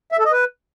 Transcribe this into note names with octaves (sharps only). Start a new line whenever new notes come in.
E5
A4
D#5
B4